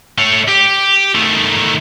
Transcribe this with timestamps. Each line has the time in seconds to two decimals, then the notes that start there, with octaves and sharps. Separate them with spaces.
0.18 A3 C#5
0.48 G4
1.15 D#3 A3